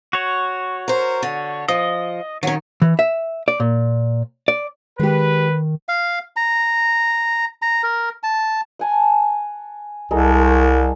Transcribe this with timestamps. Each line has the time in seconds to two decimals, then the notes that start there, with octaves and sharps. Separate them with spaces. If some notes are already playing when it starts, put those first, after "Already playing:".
0.13 F#4 C#5
0.88 A#4 C5
1.22 D3
1.68 F3 D#5
2.43 D#3 F#3 C#4
2.82 E3
2.99 E5
3.48 D5
3.60 A#2
4.48 D5
5.00 D#3 G#3 G4 B4
5.89 F5
6.36 A#5
7.62 A#5
7.83 A#4
8.23 A5
8.79 F#5 G#5 A5
10.11 C2 G#3 A4 A#4